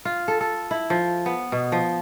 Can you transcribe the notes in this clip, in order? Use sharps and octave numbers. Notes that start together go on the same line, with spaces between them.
F4
A4
A4
E4
F3
B3
B2
F3